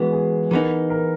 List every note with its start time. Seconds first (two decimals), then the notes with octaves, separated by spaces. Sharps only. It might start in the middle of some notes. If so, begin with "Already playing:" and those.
Already playing: E3 G#3 B3 F#4
0.13 G#4
0.51 E3 B3 D#4 A#4
0.90 A#4